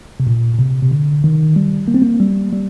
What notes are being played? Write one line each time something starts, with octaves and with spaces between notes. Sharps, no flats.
C3
A#2
A#2
C3
C3
D3
D#3
G3
A#3
C4
A#3
G3
G3